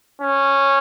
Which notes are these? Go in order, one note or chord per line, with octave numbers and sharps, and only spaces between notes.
C#4